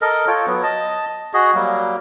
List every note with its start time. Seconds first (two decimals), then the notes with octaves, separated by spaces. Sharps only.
0.02 A4 A#4 D#5
0.27 F4 A4 C#5 G5
0.46 F#3 B3
0.63 D#5 A5
1.33 F#4 G#4 D#5
1.55 F#3 G3 A#3